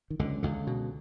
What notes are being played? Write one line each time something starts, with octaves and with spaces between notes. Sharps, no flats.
D#3
C#2 D3
C#2 D3
B2